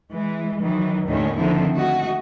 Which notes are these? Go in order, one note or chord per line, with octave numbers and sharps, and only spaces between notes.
E3 G#3
D#3 E3 F#3
D#2 A2 D3 D#3 A3 C#4
D3 D#3 F3 C4 E4
A3 F#4 D#5